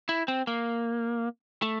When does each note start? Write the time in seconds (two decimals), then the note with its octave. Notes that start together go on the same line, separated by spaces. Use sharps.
0.09 E4
0.28 C4
0.47 A#3
1.62 A3